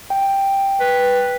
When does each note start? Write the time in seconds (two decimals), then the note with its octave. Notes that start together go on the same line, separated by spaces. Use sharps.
0.10 G5
0.80 B4